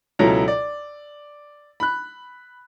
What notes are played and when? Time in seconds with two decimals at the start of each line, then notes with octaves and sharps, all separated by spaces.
0.19 C#2 B2 F#3 E4 A4 A#5
0.48 D5
1.80 B5 F#6